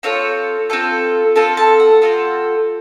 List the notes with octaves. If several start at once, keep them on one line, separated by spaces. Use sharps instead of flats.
C4 F4 A4 C#5
C4 F4 A4
C4 F4 A4 A5
A5
F#5
C4 F4 A4